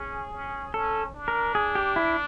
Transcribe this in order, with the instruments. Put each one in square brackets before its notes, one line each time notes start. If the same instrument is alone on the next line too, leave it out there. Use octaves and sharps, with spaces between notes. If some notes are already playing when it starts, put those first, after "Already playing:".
Already playing: [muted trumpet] C#4 [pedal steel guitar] G#4
[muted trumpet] C#4
[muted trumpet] C#4 [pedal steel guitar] A4
[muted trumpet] D4
[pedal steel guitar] A#4
G#4
G4
E4